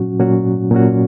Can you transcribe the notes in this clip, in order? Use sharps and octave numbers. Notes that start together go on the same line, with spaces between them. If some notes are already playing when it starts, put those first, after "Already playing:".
Already playing: A#2 F#3 C#4 F#4
A#2 F#3 C#4 F#4
A#2 F#3 C#4 F#4